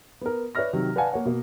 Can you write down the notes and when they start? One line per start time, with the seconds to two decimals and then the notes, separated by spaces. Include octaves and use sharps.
0.21 B3 A#4
0.55 B4 C#5 D5 E5 F6 A#6
0.73 C3 D#3 F#3
0.96 B4 D5 F5 F#5 G#5 A5
1.12 A#3 C#5 F#5
1.25 B2 A#3